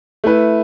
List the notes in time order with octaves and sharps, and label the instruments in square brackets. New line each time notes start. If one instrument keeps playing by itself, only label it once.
[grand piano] A3 E4 B4